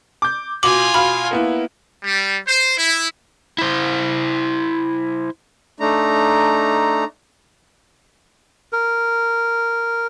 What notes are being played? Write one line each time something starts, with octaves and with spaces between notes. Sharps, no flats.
D6 G6
B2 F4 G#5 D6 F#7
B2 F5 B5
A#3 B3 E4
G3
C5
E4
E4 C5
A3 D4 D#4 A#5
A#4